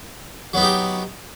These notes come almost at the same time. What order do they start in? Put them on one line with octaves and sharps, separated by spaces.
F#3 B3 D#4 G4